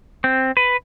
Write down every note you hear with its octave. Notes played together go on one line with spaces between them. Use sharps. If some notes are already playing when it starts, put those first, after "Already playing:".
C4
B4